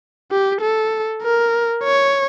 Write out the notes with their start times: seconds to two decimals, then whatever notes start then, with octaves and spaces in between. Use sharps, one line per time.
0.31 G4
0.61 A4
1.23 A#4
1.84 C#5